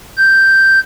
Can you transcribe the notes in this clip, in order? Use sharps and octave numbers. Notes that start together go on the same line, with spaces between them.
G6